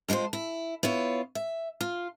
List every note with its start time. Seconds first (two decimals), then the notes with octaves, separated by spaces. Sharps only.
0.08 F2 G#3 D4 F4 C5
0.33 E4
0.83 B3 E4 F4 C#5
1.35 E5
1.81 F4